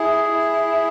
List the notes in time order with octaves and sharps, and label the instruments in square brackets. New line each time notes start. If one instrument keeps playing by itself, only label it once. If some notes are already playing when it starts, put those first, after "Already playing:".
Already playing: [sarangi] E4 [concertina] G#4
[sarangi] E4